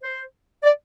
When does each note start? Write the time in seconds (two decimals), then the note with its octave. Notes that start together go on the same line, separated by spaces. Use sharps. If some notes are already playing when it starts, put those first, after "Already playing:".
0.02 C5
0.64 D5